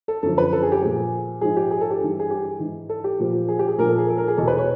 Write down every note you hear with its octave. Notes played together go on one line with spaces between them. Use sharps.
A4
F#2 D3 F3 A4
B4
A4
G#4
G4
A#2 F3 G#4
G#2 F3 G#4
G4
G#4
A4
G4
G2 E3
G#4
G4
G#2 E3
A4
G4
A#2 F3
G#4
G4
G#4
A#2 F3 A#4
A4
G#4
A4
A#4
G#4
E2 B2 A4
B4
C#5